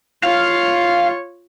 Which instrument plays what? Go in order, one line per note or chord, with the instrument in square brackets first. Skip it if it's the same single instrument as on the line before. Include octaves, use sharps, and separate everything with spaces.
[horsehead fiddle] F4 C#5 [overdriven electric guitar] F5